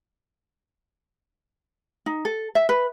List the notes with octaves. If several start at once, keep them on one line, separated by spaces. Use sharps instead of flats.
D#4
A4
E5
B4